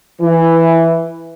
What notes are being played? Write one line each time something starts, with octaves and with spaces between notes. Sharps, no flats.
E3